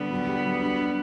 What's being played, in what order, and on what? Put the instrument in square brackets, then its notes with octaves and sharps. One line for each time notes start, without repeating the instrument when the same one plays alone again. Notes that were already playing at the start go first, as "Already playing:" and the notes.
Already playing: [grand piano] D3 [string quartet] G3 B3
[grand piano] F#3
G4
F#3
D4
D4